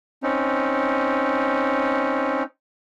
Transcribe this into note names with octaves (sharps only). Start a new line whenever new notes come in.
C4 C#4 D#4